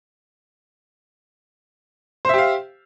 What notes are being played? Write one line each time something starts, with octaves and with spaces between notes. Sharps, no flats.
G4 C5 E5 F5